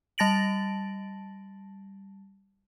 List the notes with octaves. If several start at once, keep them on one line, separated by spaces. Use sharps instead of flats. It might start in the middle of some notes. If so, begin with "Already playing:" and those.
G3 A5 A6 A#6 D7 F#7